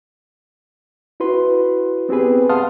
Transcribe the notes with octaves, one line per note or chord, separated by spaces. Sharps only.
E4 F#4 B4 C6
B3 C4 G4 G#4 B4
F5 F#5 A5 C6 D#6 F6